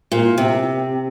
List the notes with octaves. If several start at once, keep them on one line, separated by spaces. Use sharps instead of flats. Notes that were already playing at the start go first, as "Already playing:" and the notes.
A#2
C3